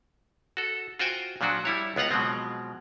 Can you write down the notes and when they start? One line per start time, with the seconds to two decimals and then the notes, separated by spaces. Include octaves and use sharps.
0.57 F#4 A4
0.99 F4 F#4 C5 G5 G#5
1.41 A#2 F3 F#3 D4 F#4
1.65 G3 E4 C#5
1.96 C#2 B3 F4 F#5 A#5
2.11 B2 F3 F#3 G#3 C4